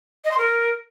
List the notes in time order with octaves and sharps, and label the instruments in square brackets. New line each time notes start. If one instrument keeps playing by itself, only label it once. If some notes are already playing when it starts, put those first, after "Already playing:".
[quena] D#5
C6
A#4